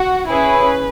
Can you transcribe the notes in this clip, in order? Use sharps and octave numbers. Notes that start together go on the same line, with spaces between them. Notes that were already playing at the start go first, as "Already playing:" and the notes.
Already playing: F#4
C#4 E4 G#4 B4